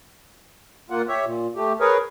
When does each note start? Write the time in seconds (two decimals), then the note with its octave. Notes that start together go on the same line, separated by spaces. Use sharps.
0.90 A#2 A#3 F4 F#5
1.08 G4 C#5 E5
1.25 A#2
1.56 A3 G4
1.80 G#4 A#4 B4 C#5